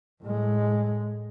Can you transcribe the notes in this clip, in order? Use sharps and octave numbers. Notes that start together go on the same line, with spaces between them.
A2 G#3